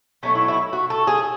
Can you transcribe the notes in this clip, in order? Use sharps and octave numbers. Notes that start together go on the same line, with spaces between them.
B2 F#3 A3 C#4
E4
E4
F#4
A4
G#4